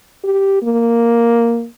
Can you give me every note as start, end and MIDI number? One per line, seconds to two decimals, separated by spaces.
0.24 0.60 67
0.62 1.66 58